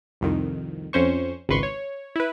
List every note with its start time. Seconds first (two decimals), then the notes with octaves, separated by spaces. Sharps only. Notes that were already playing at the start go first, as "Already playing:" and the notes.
0.21 C2 F2 D#3
0.93 F2 C#4 C5 C#6
1.49 G#1 C#2 B4 C6 C#6
1.63 C#5
2.16 E4 B4